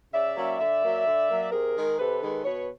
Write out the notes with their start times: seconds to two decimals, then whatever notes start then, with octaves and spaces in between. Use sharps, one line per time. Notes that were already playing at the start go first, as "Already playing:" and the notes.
0.12 C#3 D5 E5
0.36 F#3 A#3 C#4
0.58 D3 D5 E5
0.82 F#3 A#3
1.05 D3
1.28 F#3 A#3
1.51 C3 G#4 A#4
1.75 D#3 G#3
1.98 C3 A4 B4
2.21 D#3 G#3
2.44 B2 B4 C#5